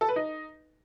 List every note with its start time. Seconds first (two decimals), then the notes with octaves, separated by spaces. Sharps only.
0.01 A4
0.09 B4
0.16 D#4